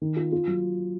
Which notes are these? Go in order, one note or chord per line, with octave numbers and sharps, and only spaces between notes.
D#3
F4
F4
F#3